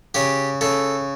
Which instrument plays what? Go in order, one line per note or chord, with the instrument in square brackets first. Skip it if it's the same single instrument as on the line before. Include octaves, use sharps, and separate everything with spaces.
[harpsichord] C#3 G4
C#3 A4